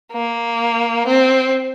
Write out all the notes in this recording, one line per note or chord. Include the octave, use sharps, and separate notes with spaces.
A#3
C4